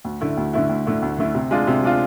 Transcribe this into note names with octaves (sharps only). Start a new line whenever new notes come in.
D2
D3 A3 E4
D2
D3 A3 E4
D2
D3 A3 E4
D2
D3 A3 E4
C3
G#3 D4 F4
C3
G#3 D4 F4